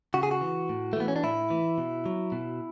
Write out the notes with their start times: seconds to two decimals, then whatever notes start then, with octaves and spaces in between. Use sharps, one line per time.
0.14 C#3 F#4
0.23 G#4
0.31 F#4
0.41 E3
0.69 A2
0.93 A3
0.96 E3 B3
1.08 C#4
1.16 D4
1.23 A2 E4
1.50 E3
1.78 B2
2.06 F#3
2.32 B2